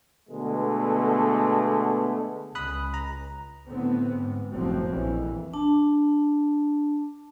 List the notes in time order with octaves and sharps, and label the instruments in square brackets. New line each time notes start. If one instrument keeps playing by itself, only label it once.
[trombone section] B2 D3 G#3 A3 B3
[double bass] C#2 [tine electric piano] B5 D#6 F#6
[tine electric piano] A#5
[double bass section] A2 D3 B3 C4
G#2
F#1 A2 C3 F3 F#3 C4
A#1 F2 E3
[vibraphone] D4 A5